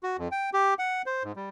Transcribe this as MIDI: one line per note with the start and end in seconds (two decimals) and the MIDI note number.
0.03 0.17 66
0.18 0.28 41
0.32 0.50 79
0.54 0.74 67
0.79 1.02 78
1.06 1.23 72
1.24 1.32 44
1.36 1.49 55